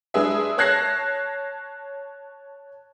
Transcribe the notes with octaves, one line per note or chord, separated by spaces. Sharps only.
G#3 D4 G#4 B4 E5
C#5 A5 F#6 G#6 A#6 C7